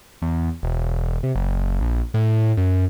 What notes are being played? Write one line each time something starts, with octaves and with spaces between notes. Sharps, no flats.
E2
E1
C3
F#1
A#1
A2
F#2